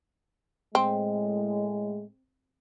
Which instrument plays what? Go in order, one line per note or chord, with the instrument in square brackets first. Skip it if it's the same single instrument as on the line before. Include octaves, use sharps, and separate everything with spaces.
[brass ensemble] A2 G#3 [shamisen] C4